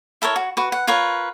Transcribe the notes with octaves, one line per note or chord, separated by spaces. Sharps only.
E4 A4 A#4 C#5
F#4
F#4 B4
F#5
F4 A#4 B4 C#5